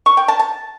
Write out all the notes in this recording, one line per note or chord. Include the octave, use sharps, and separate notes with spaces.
C#6
G5
A5
A5